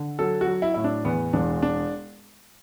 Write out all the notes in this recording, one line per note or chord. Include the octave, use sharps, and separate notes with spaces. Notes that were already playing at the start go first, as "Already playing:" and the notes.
Already playing: D3
F#3 A4
F#4
F#3
E4
A2 E4
D4
E2 B3
E1 D4
D4